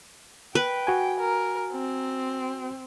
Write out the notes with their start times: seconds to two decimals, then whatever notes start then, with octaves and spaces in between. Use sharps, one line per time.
0.55 B4 G5
0.87 F#4 G#5
1.20 A#4
1.72 C4